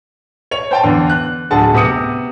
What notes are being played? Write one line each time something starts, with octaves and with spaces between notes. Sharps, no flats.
C#5 F7
C5 G5 A5
E2 D3
F#6
D1 D3 G#4 F#5 A5
C3 B3 D#6 C#7